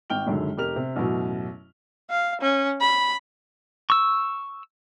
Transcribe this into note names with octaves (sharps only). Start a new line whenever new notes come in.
G#1 G5 F6 G7
C#2 F#2 D3 D#3
F1 G4 A#4 F6 F7
C3
A1 F#2 B2 F#3
F5
C#4
B5
C#6 E6